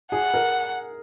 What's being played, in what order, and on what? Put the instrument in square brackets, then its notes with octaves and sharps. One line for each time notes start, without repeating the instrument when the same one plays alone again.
[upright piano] G#4 [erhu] F#5
[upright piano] A#4